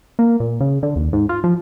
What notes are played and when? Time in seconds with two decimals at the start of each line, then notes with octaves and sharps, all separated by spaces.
0.19 A#3
0.40 A#2
0.60 C#3
0.83 D3
0.96 D#2
1.13 G#2
1.29 F4
1.44 F3